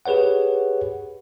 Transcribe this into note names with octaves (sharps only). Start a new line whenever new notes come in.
G4 G#4 B4 C#5 F#5